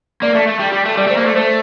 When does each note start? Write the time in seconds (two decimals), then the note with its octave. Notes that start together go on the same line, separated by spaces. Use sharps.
0.22 A#3 D5
0.35 A3
0.47 A3
0.60 G3
0.73 G3
0.86 A3
0.97 G3 D5
1.07 A3
1.10 C5
1.17 A#3
1.23 A3 D5
1.36 A3 C5